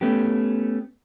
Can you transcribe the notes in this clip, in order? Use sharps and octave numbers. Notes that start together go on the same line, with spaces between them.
A3 B3 C#4 G4